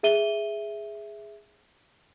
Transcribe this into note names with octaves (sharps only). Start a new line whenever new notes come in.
G#4 E5 D#7 G7